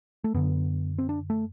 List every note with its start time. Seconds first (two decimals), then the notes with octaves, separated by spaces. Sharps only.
0.24 A3
0.34 F#2 D3 B3
0.98 C4
1.09 D4
1.30 A3